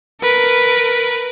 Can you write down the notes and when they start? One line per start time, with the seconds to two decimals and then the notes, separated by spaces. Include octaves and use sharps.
0.22 A#4 B4